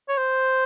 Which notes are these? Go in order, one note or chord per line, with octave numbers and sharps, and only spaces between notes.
C#5
C5